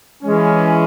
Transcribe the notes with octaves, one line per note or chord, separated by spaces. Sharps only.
E3 G#3 C#4